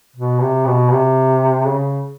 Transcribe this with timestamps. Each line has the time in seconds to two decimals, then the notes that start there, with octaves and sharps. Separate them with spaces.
0.16 B2
0.41 C3
0.67 B2
0.92 C3
1.68 C#3